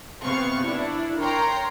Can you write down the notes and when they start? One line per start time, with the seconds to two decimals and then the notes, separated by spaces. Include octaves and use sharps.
0.24 C3 B3 C4 F5 C#6
0.64 D4 E4
1.19 A#4 C#5 G5 A#5 C6